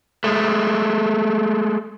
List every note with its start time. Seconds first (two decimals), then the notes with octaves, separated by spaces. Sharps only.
0.24 G#3 A3